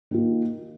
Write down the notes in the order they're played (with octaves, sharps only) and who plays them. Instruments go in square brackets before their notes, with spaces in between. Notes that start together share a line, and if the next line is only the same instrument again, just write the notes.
[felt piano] D#3 A#3 F4